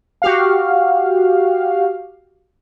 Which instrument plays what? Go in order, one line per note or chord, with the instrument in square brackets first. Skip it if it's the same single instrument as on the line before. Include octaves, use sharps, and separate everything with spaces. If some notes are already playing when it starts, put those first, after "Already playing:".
[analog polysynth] F#4 G4 F5